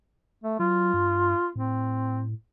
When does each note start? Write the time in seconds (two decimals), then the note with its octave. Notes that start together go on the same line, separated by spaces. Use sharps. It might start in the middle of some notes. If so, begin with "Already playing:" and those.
0.44 A3
0.59 F#3 F4
0.94 G2
1.56 A2 C4